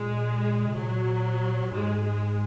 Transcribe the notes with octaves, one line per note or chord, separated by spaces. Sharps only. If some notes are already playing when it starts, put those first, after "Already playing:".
Already playing: A#2 G#3
C3
A#2 F#3
G#2 G#3
G#3